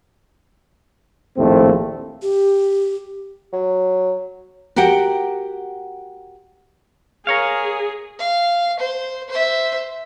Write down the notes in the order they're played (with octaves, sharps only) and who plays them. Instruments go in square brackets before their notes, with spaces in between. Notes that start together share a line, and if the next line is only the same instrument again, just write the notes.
[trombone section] A#1 D#2 A2 A3 C4
[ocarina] G4
[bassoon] F#3
[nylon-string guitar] F#4 G4 A#4 F#5 G5
[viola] G#4 [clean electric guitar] A#4 C#5 F5
[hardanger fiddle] F5
C5
C5 E5